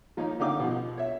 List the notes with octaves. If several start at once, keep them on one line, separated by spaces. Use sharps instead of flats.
F3 A#3 D#4 C#5
D3 C#4 D#4 G4 F5 D6
B2 F3
C#5 E5